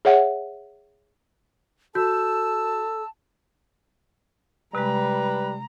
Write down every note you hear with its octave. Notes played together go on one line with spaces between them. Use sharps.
G#4 C#5 E5 F#5
F#4 A4 A5 E6 G6
C3 G3 G#3 B4 A#5